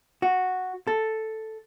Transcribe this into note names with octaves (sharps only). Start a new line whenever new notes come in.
F#4
A4